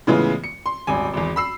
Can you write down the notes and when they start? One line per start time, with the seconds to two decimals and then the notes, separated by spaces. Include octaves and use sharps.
0.07 A2 C#3 E3 G#3 B3 F4
0.44 C#7
0.66 C6
0.87 D#1 G#1 G#5
1.14 G#1 E2
1.36 B5 E6 C7